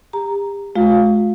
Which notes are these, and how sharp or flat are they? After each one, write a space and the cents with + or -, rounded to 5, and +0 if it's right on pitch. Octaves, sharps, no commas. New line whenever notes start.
G4 +35 A#5 +0
G#3 +45 F4 +40 F5 +0